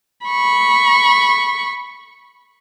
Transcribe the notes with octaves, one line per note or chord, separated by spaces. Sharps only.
B5 C#6